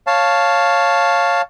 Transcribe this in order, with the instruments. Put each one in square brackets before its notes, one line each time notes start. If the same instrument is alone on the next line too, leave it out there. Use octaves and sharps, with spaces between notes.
[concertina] C#5 F5 A5